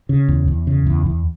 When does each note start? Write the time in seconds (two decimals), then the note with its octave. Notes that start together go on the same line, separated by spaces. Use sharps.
0.09 C#3
0.28 E2
0.48 E2
0.67 C#3
0.87 E2
1.06 E2